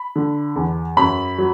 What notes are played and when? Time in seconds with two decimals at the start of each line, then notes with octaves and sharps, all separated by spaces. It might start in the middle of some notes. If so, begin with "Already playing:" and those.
Already playing: B5
0.16 D3
0.56 E2
0.97 F#2 B5
1.38 F#3